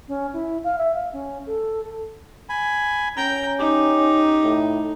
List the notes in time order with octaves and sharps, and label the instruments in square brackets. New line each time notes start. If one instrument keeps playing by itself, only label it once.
[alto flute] C#4
E4
F5
E5
F5
C#4
A4
[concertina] G#5 B5
[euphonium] C#4 [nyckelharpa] G5 [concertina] A#5
[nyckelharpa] D#4 [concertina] G4
[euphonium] A2